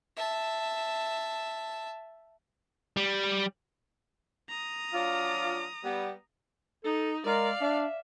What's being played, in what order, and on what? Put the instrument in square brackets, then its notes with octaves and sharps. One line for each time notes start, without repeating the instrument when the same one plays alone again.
[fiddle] E5 A5
[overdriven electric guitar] G3
[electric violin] A#5 D#6
[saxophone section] F#3 D4 F4
G3 B3
[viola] D#4 [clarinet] A4
[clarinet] G#3 [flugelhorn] A#4 [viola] D5 F5
[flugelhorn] D4 [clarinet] E5